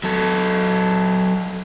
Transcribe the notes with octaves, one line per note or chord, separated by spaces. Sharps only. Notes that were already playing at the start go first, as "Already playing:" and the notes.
F#3 A4